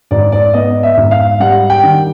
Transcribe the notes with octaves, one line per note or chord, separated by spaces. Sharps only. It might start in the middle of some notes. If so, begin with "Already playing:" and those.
G#2 D5
D5
B3 D#5
E5
G#2
F5
G3 F#5
G5
D#3